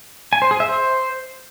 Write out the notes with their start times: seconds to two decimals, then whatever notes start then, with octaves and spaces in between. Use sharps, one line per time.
0.33 G#5
0.42 C5
0.51 G#4
0.60 E5
0.69 C5